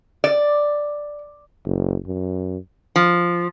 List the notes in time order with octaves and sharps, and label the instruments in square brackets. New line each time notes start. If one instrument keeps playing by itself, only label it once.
[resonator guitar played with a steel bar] D5
[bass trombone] F#1
F#2
[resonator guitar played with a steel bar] F3